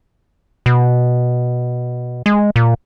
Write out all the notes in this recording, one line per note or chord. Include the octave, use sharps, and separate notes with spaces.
B2
G#3
A#2